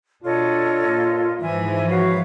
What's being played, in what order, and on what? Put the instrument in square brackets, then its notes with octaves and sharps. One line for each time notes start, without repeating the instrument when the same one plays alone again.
[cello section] B2 D4 [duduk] F4 [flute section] A4 C#5 D#5
[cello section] A#2
[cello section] G#2 E3 F3 [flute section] E5 G#5
[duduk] F#4 [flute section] B4 C#5 F5